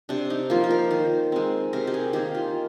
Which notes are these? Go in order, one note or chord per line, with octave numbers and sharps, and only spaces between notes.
C3 D4
D#4
F3 A#3 F4
C5
A#4
D#3 C5
G#3 C4
C3 A#4
G4
G#4
D#3 A#3 G4
F4